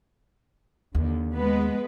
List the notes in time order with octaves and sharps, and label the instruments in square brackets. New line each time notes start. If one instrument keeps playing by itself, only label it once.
[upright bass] D#2 [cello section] D3
[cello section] G#3 B3 B4